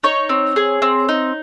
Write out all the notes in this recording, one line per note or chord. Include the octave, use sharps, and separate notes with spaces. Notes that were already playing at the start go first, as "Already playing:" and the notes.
D#4 C#5
C4
G#4
C4
D#4